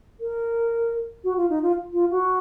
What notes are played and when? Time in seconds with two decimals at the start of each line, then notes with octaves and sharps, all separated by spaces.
0.20 A#4
1.24 F#4
1.37 F4
1.50 D#4
1.63 F4
1.93 F4
2.11 F#4